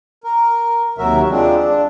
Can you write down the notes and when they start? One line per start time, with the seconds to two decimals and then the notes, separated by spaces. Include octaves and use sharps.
0.24 A#4
0.98 D#2 C3 F#3 F#4 A#4 E5
1.30 F3 G#3 C4 D4
1.56 D4